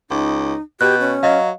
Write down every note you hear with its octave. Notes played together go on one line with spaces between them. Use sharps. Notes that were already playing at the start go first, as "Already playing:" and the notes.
C#2 D#4
B2 G4 F#6
C#4
F#3 D#5 F5